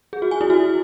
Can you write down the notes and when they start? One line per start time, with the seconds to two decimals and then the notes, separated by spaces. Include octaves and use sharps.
0.13 G#4
0.22 F#4
0.31 G#5
0.41 E4
0.50 F#4